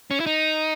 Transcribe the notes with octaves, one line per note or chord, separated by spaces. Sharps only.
C#4
E4
D#4